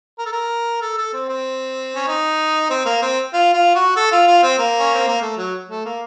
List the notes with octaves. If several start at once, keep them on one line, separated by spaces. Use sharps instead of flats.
A#4
A4
A#4
A4
A4
C4
C4
C#4
D#4
C4
A#3
C4
F4
F4
F#4
A4
F4
F4
C4
A#3
C#4
C4
A#3
A3
F#3
A3
A#3